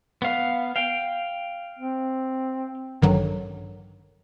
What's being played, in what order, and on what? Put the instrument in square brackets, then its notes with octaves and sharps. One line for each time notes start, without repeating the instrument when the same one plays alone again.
[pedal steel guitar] B3 F5
F5 G5
[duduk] C4
[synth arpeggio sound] A1 G2 D3 D#3 F#3